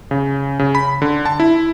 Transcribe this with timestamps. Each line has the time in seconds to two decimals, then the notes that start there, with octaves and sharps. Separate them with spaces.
0.11 C#3
0.59 C#3
0.75 B5
1.02 D3
1.25 A5
1.40 E4